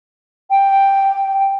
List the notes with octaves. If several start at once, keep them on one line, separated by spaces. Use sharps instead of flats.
G5